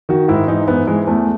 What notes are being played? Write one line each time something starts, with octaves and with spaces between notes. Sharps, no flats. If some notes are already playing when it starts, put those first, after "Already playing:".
D#3 F#4
G#2 E4
E3 D#4
G#2 B3
E3 G#3
E2 A3